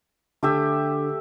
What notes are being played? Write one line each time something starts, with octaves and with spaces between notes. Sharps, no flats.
D3 A3 G4 E5